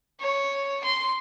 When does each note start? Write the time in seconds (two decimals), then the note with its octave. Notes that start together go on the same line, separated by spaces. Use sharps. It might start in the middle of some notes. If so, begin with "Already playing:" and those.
0.20 C#5
0.84 C6